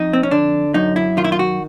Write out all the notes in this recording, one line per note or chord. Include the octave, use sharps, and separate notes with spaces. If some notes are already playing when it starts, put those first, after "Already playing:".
Already playing: F2 D#4
C4
C#4
D3 D4
F#2 D#4
E4
D#3 F4
E4
F4
F#4